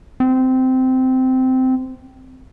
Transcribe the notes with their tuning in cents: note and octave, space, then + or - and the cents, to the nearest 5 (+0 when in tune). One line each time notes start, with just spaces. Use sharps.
C4 -15